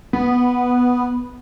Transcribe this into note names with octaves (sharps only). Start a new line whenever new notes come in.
B3